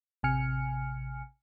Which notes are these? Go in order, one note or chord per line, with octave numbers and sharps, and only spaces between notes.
A1 C3 G#5 F6 C#7